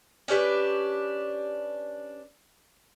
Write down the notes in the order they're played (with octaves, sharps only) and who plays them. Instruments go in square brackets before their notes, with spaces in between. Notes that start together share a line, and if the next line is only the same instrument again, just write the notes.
[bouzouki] C#4 D4 G4 B4